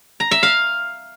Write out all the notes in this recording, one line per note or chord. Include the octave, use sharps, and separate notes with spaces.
A#5
E5
F5